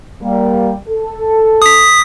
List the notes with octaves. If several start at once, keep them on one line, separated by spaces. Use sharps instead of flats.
G3 A#3
A4
D#6 B6